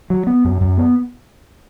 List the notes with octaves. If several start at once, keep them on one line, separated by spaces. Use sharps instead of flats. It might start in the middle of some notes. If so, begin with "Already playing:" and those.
F#3
B3
F#2
F#2
B3